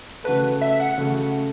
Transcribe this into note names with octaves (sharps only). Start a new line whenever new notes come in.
C#3 A3 F#4 A4 B4
E5
F#5
C#3 A3 F#4